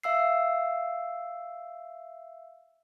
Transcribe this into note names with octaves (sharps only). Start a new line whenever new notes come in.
E5 F5 E6 C7